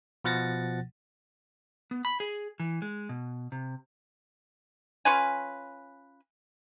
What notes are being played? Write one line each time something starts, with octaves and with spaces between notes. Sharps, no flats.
B2 F3 F#5 A6 A#6
B3
B5
G#4
E3
G#3
B2
C3
C#4 F4 B4 G#5